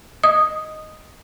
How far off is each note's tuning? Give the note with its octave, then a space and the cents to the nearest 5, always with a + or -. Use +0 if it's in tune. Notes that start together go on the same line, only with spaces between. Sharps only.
D#5 +0 D#6 +0